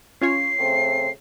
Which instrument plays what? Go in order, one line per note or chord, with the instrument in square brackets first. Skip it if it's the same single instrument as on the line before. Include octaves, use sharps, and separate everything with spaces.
[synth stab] C#4 F4 C#5 [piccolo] C7
[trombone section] C#3 A3 C4